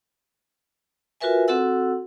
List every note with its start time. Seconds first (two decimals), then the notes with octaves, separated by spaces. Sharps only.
1.21 F4 F#4 A#4 B4 E5 G#5
1.48 C4 F#4 A4 F#5 E6